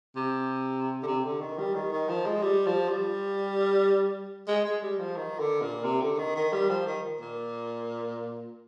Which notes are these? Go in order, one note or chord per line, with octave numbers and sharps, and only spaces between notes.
C3
D3
C3
D3
D#3
G3
D#3
D#3
F3
G#3
G3
F3
G3
G#3
G#3
G3
F3
D#3
D3
A#2
C3
D3
D#3
D#3
G3
F3
D#3
A#2